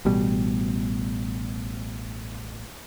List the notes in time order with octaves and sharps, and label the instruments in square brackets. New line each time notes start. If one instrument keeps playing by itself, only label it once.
[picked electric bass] A1 B2 G3